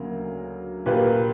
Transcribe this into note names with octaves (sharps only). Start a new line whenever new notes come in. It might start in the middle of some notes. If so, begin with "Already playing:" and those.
Already playing: D2 C#3 F#3 A#3
A#2 A#3 G4 B4